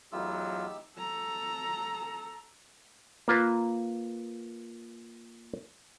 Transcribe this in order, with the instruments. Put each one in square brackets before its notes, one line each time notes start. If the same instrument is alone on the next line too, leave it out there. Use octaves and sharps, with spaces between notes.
[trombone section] E2 F#3 [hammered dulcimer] A3 D#4 B5 [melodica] F4 [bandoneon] G4 E6
[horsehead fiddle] A4 A#5
[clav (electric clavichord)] A#3 F4 B4